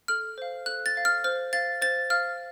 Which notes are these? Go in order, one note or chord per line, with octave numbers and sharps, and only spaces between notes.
A4 F6
C5 F5
A4 F#6
A6
C5 F5
F6
C5 F6
F5 A6
C5 A6
F5 F6